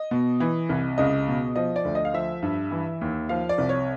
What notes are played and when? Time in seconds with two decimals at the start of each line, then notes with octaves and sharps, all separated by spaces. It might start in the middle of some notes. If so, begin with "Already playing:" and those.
Already playing: D#5
0.11 B2
0.40 E3
0.70 C2
0.98 C#2 D#5
1.28 B2
1.56 F3 D#5
1.76 D5
1.85 D2
1.95 D#5
2.05 F5
2.14 F3 E5
2.42 G2
2.71 E3
3.01 D#2
3.29 F3 F5
3.49 D5
3.58 C2
3.69 C#5